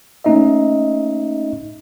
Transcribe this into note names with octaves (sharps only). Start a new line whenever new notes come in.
A3 A#3 C#4 D#4 D#5 E5